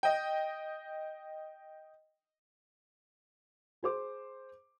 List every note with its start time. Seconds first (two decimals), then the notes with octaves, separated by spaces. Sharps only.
0.03 D#5 G5
3.83 G#4 C5 D6